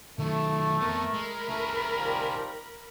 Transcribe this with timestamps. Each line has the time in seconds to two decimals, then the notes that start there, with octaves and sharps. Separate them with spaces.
0.19 D#3 F#3 A3
0.81 F2 B3 A#4 B5
1.14 G#3
1.49 E3 A3 F4 G#4
1.96 D#3 F3 G3